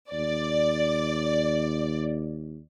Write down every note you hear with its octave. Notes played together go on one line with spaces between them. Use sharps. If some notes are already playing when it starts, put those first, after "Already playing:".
D#2 D5